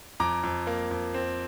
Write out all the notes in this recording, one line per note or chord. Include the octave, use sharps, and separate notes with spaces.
F2 A#5 D6
F2
A#3
F2
C4